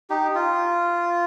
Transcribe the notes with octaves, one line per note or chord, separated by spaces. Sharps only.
D#4 G4
F4